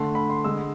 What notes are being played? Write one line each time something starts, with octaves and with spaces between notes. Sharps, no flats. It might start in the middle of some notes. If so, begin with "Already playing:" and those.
Already playing: D3 A3 C6
B5
C6
D3 G#3 E6